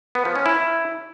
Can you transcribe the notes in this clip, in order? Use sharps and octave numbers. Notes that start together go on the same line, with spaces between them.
B3
F3
C#4
E4